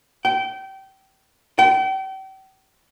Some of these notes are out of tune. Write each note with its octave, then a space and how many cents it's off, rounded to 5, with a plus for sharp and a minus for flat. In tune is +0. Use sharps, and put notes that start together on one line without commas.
G5 -25
G5 -40